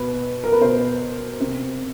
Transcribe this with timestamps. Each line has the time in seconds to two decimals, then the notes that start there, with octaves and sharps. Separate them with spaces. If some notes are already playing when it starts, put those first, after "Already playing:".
Already playing: B2 B4
0.44 A#4
0.52 B4
0.61 B2 C5
1.40 C3